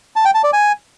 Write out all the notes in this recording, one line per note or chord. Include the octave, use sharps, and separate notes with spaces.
A5
G5
A5
D5
G#5